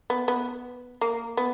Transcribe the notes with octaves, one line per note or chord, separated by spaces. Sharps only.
B3
B3
A#3
B3